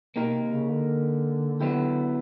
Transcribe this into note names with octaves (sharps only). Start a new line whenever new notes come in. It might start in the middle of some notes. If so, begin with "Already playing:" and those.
B2 A#3 D#4 G4 A#4
C3
C#3
D3
F#3 B3 E4 G4